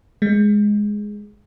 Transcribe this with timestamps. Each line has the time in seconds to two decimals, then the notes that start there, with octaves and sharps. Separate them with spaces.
0.22 G#3